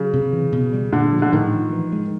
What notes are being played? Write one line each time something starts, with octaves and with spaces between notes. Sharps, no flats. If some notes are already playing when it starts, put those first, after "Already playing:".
Already playing: C#3 F#3
C3
E3
B2
G3
A#2 D3
F3
D3
A2 D#3
F3
E3
G#3